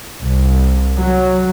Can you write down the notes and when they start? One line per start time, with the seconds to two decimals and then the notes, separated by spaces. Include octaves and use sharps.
0.22 C2
1.00 F#3